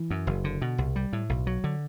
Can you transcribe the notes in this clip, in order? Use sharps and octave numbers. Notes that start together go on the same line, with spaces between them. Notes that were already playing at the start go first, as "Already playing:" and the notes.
Already playing: E3
F#2
F#1
D3
B2
C2
G3
A2
B1
F#3
D3